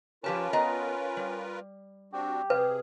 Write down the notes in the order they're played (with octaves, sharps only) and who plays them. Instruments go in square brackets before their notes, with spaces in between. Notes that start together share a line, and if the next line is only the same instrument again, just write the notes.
[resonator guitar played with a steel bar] F3 G4 A5 [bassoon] C#4 [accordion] F4 A#4 B4
[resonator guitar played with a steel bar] B3 D#5 A#5
G3
[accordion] C4 D4 F#4 [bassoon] G4
[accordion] C3 G#4 [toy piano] B4